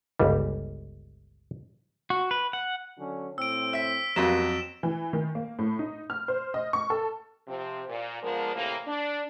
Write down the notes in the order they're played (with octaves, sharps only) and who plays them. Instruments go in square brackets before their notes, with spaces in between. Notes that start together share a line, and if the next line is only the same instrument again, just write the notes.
[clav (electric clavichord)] G1 C#2 G3
[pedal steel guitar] F#4
B4
F#5
[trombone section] D3 F#3 C#4
[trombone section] A2 C4 [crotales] E6 D7
[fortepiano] E5 [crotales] E6 B6
[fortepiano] F2 F#3 [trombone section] A#3 B3 G4 [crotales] E7
[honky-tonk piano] E3
D#3
A#3
A2
D#4
F6
C5
D#5
C#6
A4
[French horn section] C3 F3 C4
A#2
F3 G#3 A#3 B3 D4 A#4
A2 C3 E3 A#3
D4